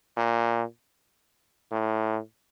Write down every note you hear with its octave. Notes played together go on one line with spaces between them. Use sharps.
A#2
A2